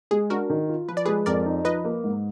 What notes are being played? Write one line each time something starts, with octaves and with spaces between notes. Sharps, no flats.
G#3 G#4
D4 F#4 A#4
D#3
F4
F3 B4
D5
G#3 G#4 B4
F2 A#4 D5
D#4
F3 B4 D#5
A#3
G#2